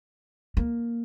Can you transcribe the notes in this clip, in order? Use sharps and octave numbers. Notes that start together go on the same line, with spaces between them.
A#3